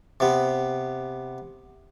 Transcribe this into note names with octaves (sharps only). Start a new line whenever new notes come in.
C3 B3